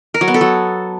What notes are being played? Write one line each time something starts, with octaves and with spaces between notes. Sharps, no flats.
A#4
F#3
B3
A4
F#3